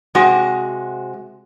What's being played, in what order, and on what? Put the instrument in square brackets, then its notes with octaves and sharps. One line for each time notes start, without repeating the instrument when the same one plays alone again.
[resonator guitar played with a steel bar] C3 G#3 F#4